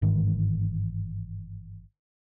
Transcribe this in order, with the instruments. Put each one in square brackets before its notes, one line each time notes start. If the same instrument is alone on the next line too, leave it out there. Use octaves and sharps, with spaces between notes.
[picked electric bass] G1 G#2 D#3 E3